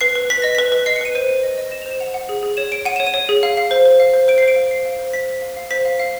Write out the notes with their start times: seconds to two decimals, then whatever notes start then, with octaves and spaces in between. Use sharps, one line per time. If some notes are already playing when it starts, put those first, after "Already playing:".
0.01 B4 C7
0.15 B4
0.30 B4 B6
0.42 D#5 A#6
0.55 B4 B6
0.72 B4
0.86 D#5 C7
0.96 C#7
1.01 B4 D#7
1.15 C5 D#7
1.29 C5
1.43 D#5
1.58 D#5
1.71 D#5 E7
1.82 F7
1.86 C5
1.91 E7
2.00 F#5 F7
2.14 F#5
2.29 G#4
2.43 G#4
2.57 C#5 E7
2.72 C#5 D7
2.85 F#5 D#7
2.96 C#5 E7
3.07 D#7
3.14 C#5
3.29 G#4
3.43 F5
3.57 F5
3.71 C5
3.85 C5
4.00 F5
4.14 C5
4.28 C5 D7
4.38 C7
4.42 C5
4.48 D7
4.56 F5
4.71 C5 C7
4.85 F5
4.99 C5
5.13 C5 B6
5.28 C5
5.42 F5
5.57 F5
5.71 C5 B6
5.85 F5
6.00 F5